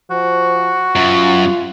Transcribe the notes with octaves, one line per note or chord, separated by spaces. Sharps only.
F3 F#4
F#2 F4